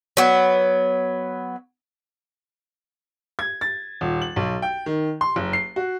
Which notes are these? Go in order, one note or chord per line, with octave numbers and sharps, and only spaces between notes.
F#3 B3
G#6
A6
D#1
F#7
B1
G5
D#3
C6
F#1
C7
F#4